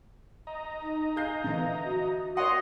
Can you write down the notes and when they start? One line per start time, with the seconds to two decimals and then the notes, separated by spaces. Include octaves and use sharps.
0.47 D#5 A#5
0.83 D#4
1.16 G#4 F5 G6 C7
1.44 D3 E3
1.85 F#4
2.37 C#5 D#5 F#5 C6